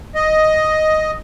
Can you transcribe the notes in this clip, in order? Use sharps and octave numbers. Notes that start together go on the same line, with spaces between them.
D#5